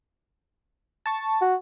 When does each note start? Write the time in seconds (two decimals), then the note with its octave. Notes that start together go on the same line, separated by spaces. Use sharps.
1.06 A5 C#6 A6
1.41 F#4